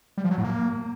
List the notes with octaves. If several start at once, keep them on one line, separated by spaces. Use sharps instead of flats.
G3
F3
F#3
A2
A#3